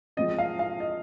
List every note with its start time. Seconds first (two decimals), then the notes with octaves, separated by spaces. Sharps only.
0.17 F3 G#3 C4 D#5
0.38 F5
0.59 F5
0.80 D#5